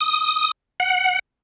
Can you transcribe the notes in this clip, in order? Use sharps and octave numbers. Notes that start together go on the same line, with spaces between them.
D#6
F#5